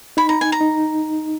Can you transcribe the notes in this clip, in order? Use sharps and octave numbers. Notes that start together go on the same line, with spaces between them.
D#4 B5
A#5
G#5
A#5
D#4